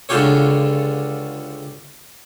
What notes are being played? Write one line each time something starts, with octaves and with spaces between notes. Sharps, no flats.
C#2 D3 D4 F4 G4 C#5